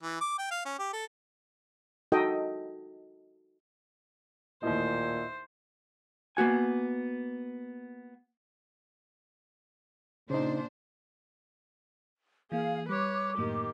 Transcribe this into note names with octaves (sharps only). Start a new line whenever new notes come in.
E3
D6
G5
F5
C#4
G4
A4
D#4 F#4 A4 D#5 G5
A1 D#2 A#2 E4 C5 D#5
A#3 B3 F#4 G#5
A#2 C#3 D4 D#4 C5
E3 A#3 G#4 F5
G3 B4 C#5 D6
F#2 A2 D#3 A#3 G4